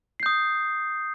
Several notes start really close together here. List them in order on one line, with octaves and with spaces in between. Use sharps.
C7 G6 D#6